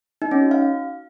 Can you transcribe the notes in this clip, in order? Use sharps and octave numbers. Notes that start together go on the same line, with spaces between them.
D#4
C#4
F#4
F5